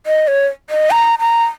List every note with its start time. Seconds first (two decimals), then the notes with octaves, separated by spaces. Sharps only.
0.06 D#5
0.28 C#5
0.70 D#5
0.91 A#5
1.19 A#5